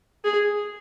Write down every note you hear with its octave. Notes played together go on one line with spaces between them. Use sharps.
G#4